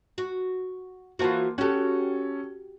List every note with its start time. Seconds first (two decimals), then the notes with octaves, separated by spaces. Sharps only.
0.18 F#4
1.19 E3 A#3 F4 F#4 C5 A5
1.58 C#4 F#4 G4 A4